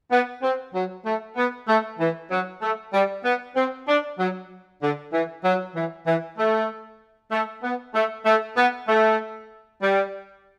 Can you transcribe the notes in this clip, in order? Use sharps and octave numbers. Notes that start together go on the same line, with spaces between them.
B3
C4
F#3
A3
B3
A3
E3
F#3
A3
G3
B3
C4
D4
F#3
D3
E3
F#3
E3
E3
A3
A3
B3
A3
A3
B3
A3
G3